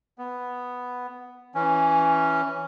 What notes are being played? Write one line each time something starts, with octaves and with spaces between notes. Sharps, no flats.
B3
E3 C#4